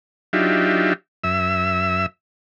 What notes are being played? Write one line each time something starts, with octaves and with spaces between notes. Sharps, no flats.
F#3 D4 D#4 F4 G4 E5
F#2 E5 E6